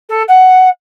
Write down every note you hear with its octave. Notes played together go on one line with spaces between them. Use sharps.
A4
F#5